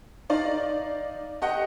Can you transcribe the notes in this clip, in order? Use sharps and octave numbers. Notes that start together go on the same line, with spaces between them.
D#4 D5 F5
G4 D#5 F#5